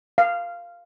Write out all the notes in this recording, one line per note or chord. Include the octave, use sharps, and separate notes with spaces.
F5